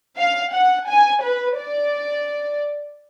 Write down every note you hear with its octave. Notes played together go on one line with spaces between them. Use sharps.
F5
F#5
G#5
B4
D5